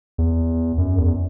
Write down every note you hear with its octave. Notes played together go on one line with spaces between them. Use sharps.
E2
F#2
E2